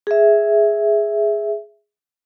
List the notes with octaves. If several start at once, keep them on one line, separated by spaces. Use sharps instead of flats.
G#4 E5